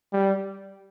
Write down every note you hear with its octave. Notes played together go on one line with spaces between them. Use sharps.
G3